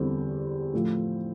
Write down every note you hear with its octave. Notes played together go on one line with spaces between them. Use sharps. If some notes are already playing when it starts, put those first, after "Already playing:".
Already playing: E2 D3 G3 C4
A2 F3